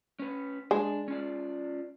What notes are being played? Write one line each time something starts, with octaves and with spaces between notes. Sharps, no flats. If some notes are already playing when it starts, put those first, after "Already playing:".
C#4 B4
G#3 D4
C#4 F4 D5